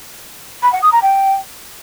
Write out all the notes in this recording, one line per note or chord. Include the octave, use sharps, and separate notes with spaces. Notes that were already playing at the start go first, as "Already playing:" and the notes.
B5
F#5
D#6
A#5
G5